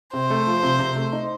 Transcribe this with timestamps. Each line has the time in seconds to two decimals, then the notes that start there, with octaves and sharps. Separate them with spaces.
0.13 C3 C5
0.30 A3
0.47 F3
0.63 C3
0.79 C3
0.96 A3
1.13 D#4